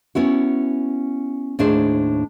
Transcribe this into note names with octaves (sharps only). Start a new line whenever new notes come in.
B3 C#4 E4 F#4
D#2 A2 D4 G#4 C5